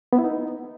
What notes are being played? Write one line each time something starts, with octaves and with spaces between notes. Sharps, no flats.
B3
E4
D#4